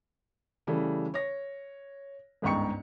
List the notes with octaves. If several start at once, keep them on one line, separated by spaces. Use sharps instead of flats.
C#3 E3 G3 A3
C#5 A#6
G1 C#2 G#2 G5 C#6 C#7